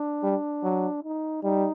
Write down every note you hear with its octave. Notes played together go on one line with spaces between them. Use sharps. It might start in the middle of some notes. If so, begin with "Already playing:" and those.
Already playing: D4
G3
F#3
D#4
G3 D#4